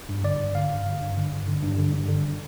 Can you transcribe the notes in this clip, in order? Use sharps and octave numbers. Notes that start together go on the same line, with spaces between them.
G2
D3 D5
G2
D3 F5
G2
D3
G2
D3
G2
D3
G2
D3
G2
D3